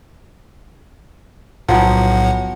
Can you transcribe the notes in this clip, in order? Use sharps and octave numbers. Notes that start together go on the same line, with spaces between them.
B1 A2 F3 F#3 B3 F#5